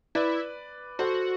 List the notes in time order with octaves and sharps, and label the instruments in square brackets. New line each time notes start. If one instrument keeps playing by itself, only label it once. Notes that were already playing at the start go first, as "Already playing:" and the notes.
[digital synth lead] E4 [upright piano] B4 D5
[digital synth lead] F#4 [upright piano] A4 C5